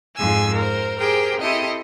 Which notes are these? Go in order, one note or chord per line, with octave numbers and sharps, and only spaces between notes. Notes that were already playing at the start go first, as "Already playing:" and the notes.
F2 G#2 G#5 E6
A#4 C5
G4 G#4 A#4 C5 G5
C4 E4 G4 A4 D#5